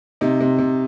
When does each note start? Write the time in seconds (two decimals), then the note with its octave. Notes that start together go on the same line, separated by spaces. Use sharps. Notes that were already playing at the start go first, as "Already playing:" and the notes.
0.21 C3 D#4
0.40 C3
0.58 C3